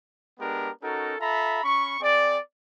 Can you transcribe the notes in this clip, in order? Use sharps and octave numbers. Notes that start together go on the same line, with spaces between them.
G#3 B3 D4 G4 A#4
C#4 D#4 F#4 A4 A#4
F4 A4 E5 A#5 B5
C#4 B5 C#6
C4 G#4 D5